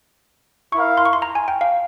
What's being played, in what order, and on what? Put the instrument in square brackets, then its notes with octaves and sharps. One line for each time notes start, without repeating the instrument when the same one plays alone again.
[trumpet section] E4 A#4 F5 [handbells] C#6
[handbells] C6
C#6
C6
A#5
G#5
G5
F5